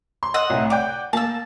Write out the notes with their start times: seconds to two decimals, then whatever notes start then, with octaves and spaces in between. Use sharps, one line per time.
0.23 C6
0.34 D#5 F#5 E6
0.50 C2 A2
0.70 D5 F#5 G5 D6
1.13 A#3 A5 E6